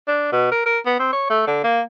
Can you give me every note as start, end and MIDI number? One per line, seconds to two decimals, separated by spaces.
0.08 0.30 62
0.32 0.48 47
0.52 0.65 70
0.66 0.79 70
0.86 0.95 59
1.00 1.08 60
1.13 1.30 73
1.30 1.43 57
1.47 1.60 50
1.64 1.81 58